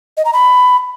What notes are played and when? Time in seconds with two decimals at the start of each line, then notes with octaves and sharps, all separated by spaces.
0.17 D#5
0.25 A#5
0.33 B5